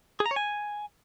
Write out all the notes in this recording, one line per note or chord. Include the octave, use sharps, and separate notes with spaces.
G#4
A#5
C#5
G#5